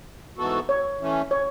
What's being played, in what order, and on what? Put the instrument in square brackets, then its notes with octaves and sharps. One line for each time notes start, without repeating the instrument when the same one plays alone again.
[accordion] G#2 E3 B3 F#4 A4
[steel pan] C#5
[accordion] E3 A3 C#4
[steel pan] C#5